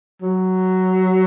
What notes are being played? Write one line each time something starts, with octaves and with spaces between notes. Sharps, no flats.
F#3